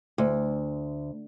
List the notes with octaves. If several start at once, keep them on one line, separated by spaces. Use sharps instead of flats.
D2